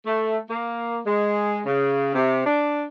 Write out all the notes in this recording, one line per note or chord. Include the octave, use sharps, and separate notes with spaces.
A3
A#3
G#3
C#3
C3
D4